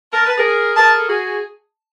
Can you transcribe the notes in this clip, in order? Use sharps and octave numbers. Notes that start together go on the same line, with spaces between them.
A#4 A5
B4
G#4 A#4
G#4 A#4 A5
A4
F#4 G#4